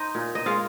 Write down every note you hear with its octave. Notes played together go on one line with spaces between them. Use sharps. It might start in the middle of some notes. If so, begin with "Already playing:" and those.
Already playing: D#4 C5 D#5
A#2
D#5
G#3 F4 F5